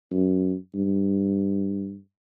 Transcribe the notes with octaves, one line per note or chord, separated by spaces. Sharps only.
F#2
G2